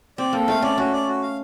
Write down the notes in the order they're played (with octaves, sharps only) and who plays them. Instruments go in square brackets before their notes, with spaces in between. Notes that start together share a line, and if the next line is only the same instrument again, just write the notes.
[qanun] C4 [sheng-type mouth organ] D5
[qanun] A#3 [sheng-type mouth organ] A4
[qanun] A3 [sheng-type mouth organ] F5
[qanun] C#4 [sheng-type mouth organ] D5
[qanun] C#4 [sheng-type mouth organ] F#4
[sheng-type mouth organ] D5
F#4
F5